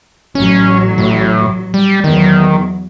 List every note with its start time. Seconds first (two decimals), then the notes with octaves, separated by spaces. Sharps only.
0.35 A1 F#3 C#4
0.98 A2
1.74 G3
2.04 E2 D#3 F#3